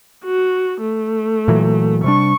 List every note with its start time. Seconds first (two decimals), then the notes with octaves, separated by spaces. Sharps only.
0.25 F#4
0.81 A3
1.48 A#2 E3 F#3
2.04 C3 G3 D4 C#6